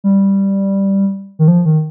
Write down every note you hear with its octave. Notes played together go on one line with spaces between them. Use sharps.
G3
D#3
F3
D#3